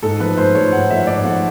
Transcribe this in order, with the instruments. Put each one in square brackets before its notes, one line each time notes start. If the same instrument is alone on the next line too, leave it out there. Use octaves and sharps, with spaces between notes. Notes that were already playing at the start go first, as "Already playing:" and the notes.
[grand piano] G#2 A4
F3 A3 B4
G#2 C5
F3 A3 C#5
G#2 F#5
F3 A3 E5
G#2 D5
F3 A3 F#5